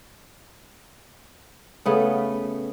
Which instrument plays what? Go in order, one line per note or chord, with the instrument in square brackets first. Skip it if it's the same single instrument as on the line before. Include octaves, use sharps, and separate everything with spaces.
[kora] C#3 A3 B3